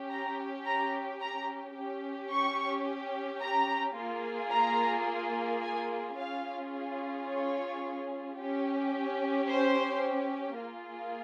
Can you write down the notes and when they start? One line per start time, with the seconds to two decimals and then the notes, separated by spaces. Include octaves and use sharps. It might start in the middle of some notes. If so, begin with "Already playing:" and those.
Already playing: C#4 G4
0.10 A#5
0.66 A#5
1.21 A#5
1.76 C#4 G4
2.31 C#6
3.42 A#5
3.96 A#3 F4 G#4
4.52 A#5
5.62 G#5
6.17 C#4 F4 G#4 F5
7.27 C#5
8.37 C#4 G4
9.48 C5
10.58 A#3 F4 G#4